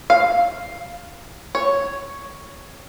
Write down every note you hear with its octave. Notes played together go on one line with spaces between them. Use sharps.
F5
C#5